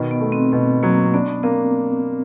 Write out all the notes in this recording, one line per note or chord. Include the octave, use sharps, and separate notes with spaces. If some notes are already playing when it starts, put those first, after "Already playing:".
Already playing: B2 D#3
B3
A3
C4
B2 C4
F#3 A#3
B3 D4
B3
A#3 C4